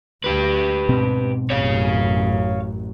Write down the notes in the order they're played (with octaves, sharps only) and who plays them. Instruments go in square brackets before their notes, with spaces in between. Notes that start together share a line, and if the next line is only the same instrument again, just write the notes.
[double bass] D2 [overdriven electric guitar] G4 B4
[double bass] G#2 [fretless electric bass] B2 C4
[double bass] A1 F#2 [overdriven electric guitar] C#5 F5